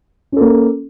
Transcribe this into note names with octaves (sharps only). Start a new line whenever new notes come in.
A#3 C#4 A4